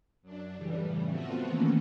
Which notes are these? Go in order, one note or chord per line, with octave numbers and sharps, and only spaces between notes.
F#2 D4
A2 C#3 E3 G3
F3 A3 B3 C4 F4 F#4
D#3 E3 A3 A#3 C#4